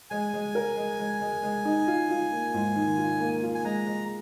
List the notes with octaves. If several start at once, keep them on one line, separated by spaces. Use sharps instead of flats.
G#3 G#5
G#3
A#4
G#3
G#3
G#3
G#3
D#4
F4
F4
A#3
G#2
D#3
F4
A#3
F4
G#5
G#3 A#5
G#3